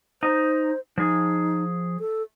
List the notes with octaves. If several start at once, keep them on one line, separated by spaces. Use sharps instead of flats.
D#4 C5
F3 D#4 G#4
A4